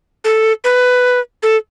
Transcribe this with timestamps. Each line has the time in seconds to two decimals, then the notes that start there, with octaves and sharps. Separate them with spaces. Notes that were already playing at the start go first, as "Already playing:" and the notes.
0.24 A4
0.64 B4
1.43 A4